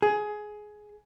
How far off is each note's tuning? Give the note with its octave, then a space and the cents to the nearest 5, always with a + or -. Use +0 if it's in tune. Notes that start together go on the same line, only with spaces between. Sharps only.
G#4 +15